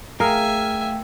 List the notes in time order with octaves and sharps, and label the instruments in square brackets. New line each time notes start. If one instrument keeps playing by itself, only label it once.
[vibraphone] A3 G5 [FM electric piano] G#4 F5 [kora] A#4 [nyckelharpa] E5 G#5